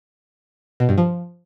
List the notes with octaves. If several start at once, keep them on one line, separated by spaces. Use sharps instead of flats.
B2
G2
F3